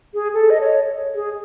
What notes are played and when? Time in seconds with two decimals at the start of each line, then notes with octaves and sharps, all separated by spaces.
0.14 G#4
0.34 A4
0.50 D#5
0.61 C#5
1.15 G#4